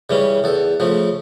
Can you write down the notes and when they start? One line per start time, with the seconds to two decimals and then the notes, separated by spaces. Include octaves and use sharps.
0.10 C#3 E3 G3 C#4
0.44 E2 A4
0.80 C#3 F3 A3